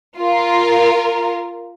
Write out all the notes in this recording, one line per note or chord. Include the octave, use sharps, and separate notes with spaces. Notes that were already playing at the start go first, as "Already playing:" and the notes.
F4 A#4